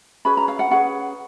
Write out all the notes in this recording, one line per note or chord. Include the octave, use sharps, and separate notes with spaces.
C#4 G#4 B4 B5
A#5
F5
F#5
C#4 G#4 B4 F#5